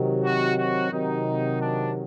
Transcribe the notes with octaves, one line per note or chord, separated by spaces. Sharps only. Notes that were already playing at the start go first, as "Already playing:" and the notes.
Already playing: C3 D#3 F#3
F#4
F#4
C3 D#3 F#3 D#4
D4